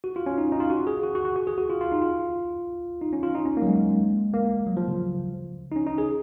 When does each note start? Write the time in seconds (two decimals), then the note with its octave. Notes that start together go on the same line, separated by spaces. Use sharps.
0.04 F#4
0.16 F4
0.26 C#4
0.38 D#4
0.52 D#4
0.60 F4
0.70 F#4
0.87 G#4
1.03 F#4
1.15 F#4
1.25 F#4
1.36 F#4
1.47 G#4
1.58 F#4
1.70 F4
1.81 F4
1.92 D#4
2.02 F4
3.01 D#4
3.13 C#4
3.23 F4
3.35 D#4
3.46 C#4
3.57 A#3
3.62 F#3
3.67 G#3
4.34 A#3
4.67 F#3
4.77 F3
4.88 C#3
5.72 D#4
5.76 C#4
5.87 D#4
5.98 G#4